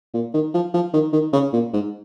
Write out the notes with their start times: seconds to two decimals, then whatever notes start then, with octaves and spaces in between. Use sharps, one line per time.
0.14 A#2
0.34 D#3
0.54 F3
0.74 F3
0.93 D#3
1.13 D#3
1.33 C#3
1.53 A#2
1.73 G#2